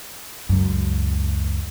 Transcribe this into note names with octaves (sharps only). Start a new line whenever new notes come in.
C#2 F#2